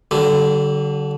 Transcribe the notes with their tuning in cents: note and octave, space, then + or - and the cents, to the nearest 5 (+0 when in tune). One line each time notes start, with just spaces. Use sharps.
D3 -15 F#3 +45